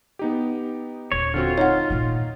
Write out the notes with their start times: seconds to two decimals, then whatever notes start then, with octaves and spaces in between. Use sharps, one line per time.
0.19 B3 D#4 G4
1.12 D#1 C#5
1.34 D3 C4 F4 F#4
1.58 D#4 C#5 F#5
1.90 A#2 D#3